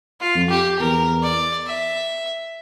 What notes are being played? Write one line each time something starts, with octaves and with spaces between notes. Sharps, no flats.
F4
F2
G4
E2 A#4
D5
E5